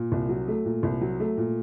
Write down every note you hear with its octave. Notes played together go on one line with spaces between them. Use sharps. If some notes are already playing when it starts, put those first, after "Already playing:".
Already playing: A#2
C2
F#3
A3
A#2
C2
F#3
A3
A#2